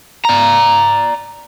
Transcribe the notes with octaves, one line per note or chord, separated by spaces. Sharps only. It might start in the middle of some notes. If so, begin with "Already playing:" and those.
D5 A#5